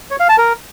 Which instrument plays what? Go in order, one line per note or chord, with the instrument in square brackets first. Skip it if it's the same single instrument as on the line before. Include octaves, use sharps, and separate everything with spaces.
[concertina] C#5
F5
A5
A#4